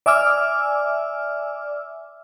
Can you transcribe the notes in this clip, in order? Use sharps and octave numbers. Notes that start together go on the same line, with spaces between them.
D5 E5 G#5 D6 E6 F6